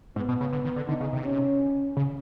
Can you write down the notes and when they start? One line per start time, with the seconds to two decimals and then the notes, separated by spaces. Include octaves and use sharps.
0.16 G#2 B3
0.29 B2
0.41 C#3
0.52 D3
0.65 D#3
0.76 D3
0.88 D3 D#4
1.00 C#3
1.13 C3
1.24 C#4
1.97 C#3